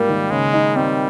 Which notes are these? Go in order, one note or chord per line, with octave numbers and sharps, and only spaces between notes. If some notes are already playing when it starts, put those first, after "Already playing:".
Already playing: G#2 G3 A#3 F4
D#3
C#3 G#3
D#4
G3 C4